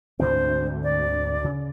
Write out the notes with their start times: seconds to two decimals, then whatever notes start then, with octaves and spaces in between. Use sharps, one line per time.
0.20 D2 G#2 D3 C4 C5
0.83 D5
1.44 C#3